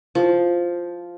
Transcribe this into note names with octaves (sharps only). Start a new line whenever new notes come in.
F3